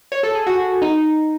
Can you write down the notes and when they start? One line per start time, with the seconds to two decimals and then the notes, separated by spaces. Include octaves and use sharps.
0.12 C#5
0.23 A4
0.35 G#4
0.47 F#4
0.82 D#4